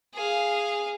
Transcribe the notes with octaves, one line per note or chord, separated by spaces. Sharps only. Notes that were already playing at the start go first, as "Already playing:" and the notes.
G#4 F5